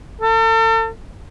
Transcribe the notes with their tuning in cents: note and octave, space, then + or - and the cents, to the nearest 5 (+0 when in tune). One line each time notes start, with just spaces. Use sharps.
A4 +40